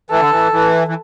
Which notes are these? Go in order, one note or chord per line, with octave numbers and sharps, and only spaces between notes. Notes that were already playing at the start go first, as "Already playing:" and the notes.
E3 A4
D3
E3
E3
E3